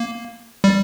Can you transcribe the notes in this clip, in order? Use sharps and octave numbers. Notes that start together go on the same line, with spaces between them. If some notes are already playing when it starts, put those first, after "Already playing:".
Already playing: A#3
G3